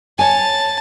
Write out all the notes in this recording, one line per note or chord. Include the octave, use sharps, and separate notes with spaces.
C#5 G#5 A5